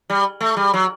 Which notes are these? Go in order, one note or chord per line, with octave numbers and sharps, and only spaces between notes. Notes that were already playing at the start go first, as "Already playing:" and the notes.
G3
A3
G3
F#3